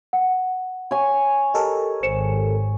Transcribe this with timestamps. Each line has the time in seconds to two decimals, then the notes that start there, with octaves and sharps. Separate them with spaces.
0.13 F#5
0.91 C#5 G#5
1.54 G4 A4 A#4 D#5
2.03 G#1 C5 C#7 E7